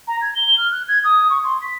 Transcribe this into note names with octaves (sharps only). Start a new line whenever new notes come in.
A#5
G#6
G7
F6
F#6
G#6
D#6
C#6
C6
B6